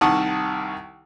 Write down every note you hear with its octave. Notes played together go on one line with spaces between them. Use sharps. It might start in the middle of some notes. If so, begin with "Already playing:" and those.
C2 D#3 F#5 A5 C#6 D#6